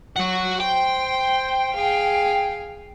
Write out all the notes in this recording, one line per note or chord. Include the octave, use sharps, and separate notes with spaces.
F#3 F#4 F#5
C5 G5
G#4 F5